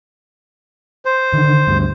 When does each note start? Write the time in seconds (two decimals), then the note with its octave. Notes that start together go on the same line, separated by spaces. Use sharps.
1.05 C5
1.33 D3 D#3
1.68 D2 G2